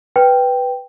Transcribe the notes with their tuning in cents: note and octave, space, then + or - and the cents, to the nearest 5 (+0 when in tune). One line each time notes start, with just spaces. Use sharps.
B4 +0 G5 +0